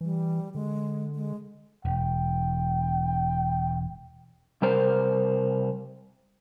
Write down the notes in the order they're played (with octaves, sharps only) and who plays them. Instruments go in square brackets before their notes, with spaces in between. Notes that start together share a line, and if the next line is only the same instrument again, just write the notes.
[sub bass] E3 [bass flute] G3
[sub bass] D3 [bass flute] G#3
[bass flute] G#3
[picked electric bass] E1 [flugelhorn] G5
[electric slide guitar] C3 G3 A#4 C5